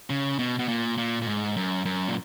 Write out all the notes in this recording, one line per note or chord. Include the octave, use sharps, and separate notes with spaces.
C#3
B2
B2
A#2
A#2
A#2
G#2
F#2
F#2
A#2